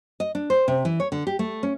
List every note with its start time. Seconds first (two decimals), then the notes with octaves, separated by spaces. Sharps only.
0.20 D#5
0.35 D4
0.50 C5
0.68 C3
0.85 E3
1.00 C#5
1.12 D3
1.27 G4
1.39 A3
1.63 C#4